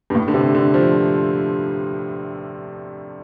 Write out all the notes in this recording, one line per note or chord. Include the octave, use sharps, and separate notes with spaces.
G2
A2
D3
C3
D3
F3